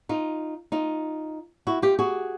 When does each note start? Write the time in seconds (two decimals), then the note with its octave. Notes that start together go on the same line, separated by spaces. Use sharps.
0.09 D#4 F4
0.72 D#4 F4
1.67 E4 F#4
1.82 F4 G4
1.99 F#4 G#4